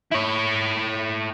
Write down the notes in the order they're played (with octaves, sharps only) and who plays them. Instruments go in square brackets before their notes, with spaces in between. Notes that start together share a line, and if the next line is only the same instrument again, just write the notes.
[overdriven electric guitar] E4 C#5